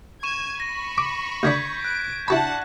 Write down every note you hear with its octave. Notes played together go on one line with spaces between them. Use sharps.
C#6 G#6 D#7 E7
B5 C#6 A#6
D6
D2 D3 D4 G6 G#6 B6
F#6 D7
D4 E4 F#4 F#5 A5 B5